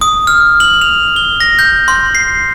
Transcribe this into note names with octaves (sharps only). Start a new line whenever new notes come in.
D#6
F6
F#7
F7
G7
A#6
G6
C6
C7